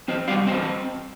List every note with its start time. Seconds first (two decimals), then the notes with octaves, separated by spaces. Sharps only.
0.08 C4 C5 D#5
0.28 G3 D5 F5
0.47 C4 C5 D#5